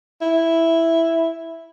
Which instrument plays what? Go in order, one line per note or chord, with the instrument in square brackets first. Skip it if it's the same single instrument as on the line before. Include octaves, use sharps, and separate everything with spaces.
[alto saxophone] E4